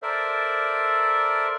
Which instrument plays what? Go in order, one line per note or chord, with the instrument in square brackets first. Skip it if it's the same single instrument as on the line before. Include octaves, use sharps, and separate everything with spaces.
[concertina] A4 A#4 C5 D5 E5